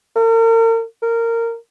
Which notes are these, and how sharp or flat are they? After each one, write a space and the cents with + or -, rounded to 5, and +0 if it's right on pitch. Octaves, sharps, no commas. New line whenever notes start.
A#4 -40
A#4 -15